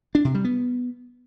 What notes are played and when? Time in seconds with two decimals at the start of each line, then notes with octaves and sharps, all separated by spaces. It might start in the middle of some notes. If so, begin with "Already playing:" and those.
0.15 D4
0.25 C3
0.35 G3
0.44 B3